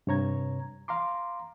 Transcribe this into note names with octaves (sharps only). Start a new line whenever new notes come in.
G2 C3 C#5 A#5 G#6
F5 A#5 C6 D6